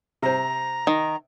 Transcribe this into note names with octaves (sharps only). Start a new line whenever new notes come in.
C3 C5 A#5
D#3